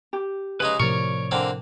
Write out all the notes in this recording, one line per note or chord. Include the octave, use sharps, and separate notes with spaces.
G4
C#3 G#3 D#4 B4
A2 C3 F3 A#4 C#5 D5 C#6
D3 A#3 C4